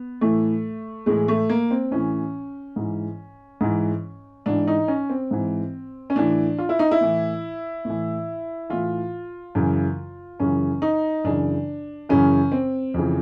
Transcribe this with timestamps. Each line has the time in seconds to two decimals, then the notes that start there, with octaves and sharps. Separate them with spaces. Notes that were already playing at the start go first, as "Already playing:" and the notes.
Already playing: B3
0.21 A2 E3 A3
1.06 A2 E3 G#3
1.28 A3
1.49 A#3
1.71 C4
1.91 A2 E3 C#4
2.76 G#2 E3
3.61 G#2 E3
4.46 G#2 E3 D4
4.67 D#4
4.88 C#4
5.10 C4
5.31 G#2 E3
6.10 C#4
6.16 A2 E3 D4
6.58 F4
6.69 E4
6.79 D#4
6.91 E4
7.01 A2 E3
7.85 A2 E3
8.70 A2 E3 F4
9.55 F#2 C#3 E3
10.40 F#2 C#3 E3 C#4
10.82 D#4
11.24 F#2 C#3 E3 D4
12.09 F#2 C#3 E3 C#4
12.52 C4
12.94 F2 C#3 E3